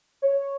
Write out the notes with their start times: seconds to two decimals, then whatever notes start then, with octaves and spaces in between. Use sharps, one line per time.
0.22 C#5